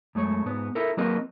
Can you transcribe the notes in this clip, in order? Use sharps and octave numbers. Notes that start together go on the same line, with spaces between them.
F#2 G#3 A3 C#5
G#2 B3
E4 A4 A#4
F#3 A#3 C4 A#4 B4 D#5